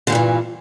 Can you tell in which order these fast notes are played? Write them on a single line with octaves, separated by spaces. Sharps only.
D3 A#2 G2 E3